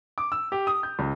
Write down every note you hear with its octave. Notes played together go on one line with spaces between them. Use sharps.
D6
E6
G4
D#6
G6
C#2